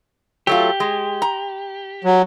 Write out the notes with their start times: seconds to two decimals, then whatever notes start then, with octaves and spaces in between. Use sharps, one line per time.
0.47 F#3 A3 F4 G4
0.80 G#3
1.22 A#5
2.04 F#3